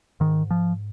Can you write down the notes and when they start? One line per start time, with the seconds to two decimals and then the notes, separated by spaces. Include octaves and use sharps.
0.20 G#2 D#3
0.51 F3